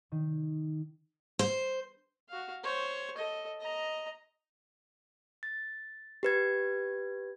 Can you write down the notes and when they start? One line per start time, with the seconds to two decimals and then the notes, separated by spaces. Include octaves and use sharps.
0.12 D#3
1.39 C5
2.29 F#4 F5
2.64 C5 C#5
3.17 A4 D#5
3.61 D#5 A#5
5.43 A6
6.23 G4 B4 G#6